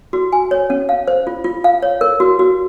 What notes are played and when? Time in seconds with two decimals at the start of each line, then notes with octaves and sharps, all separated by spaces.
0.13 F#4
0.32 G#5
0.51 C#5
0.70 C#4
0.89 F5
1.07 C5
1.27 F4
1.44 F4
1.64 F5
1.83 C#5
2.01 A#4
2.20 F#4
2.39 F#4